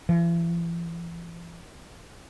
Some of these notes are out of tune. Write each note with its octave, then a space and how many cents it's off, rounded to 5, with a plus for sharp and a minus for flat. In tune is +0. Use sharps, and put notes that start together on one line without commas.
E3 +45